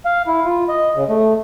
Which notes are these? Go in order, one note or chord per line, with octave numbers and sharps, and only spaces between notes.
F5
E4
F4
D#5
C#3
A3